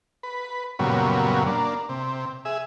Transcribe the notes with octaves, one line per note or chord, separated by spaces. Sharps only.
B4
F#2 A#2 C#3 F#3 G3 B3
A#3 D4
C3
G#4 E5